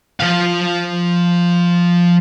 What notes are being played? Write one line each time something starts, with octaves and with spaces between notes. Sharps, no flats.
F3 F5